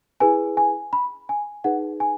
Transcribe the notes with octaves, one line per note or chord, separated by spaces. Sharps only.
E4 G#4 B4 G#5
G#5
B5
G#5
D#4 G#4 B4 F#5
G#5